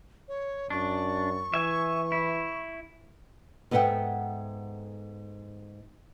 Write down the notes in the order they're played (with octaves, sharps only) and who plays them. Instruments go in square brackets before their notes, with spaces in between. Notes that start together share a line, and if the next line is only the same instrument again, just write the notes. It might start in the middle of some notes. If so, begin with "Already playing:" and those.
[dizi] C#5
[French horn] F#2 [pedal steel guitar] D4 [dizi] C#6
[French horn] E3 [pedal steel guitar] E5 G#5
[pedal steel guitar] E4
[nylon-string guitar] G#2 B3 A4 E5 F#5 G5